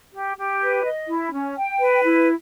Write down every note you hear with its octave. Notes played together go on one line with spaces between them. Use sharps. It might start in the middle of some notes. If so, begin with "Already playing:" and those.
G4
G4
B4
D#5
E4
C#4
G5
B4
E4